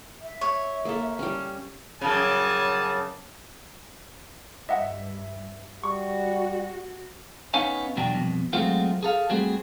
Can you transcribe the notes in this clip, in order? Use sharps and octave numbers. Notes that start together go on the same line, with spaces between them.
E5
C#5
A#3 A4
G3 C#4
F#2 C#3 G3 G#5 A5
G2 D#5 E5 F#5
G3 F#4 C#6
B3 C#4 D#4 C#5 F5 G#5
B1 E2 B2 F#3 D4 G5
C2 F2 B2
F#3 G#3 A3 C4 F4 F#4
G#4 A4 F5
G3 A3 C4 F#4 G#4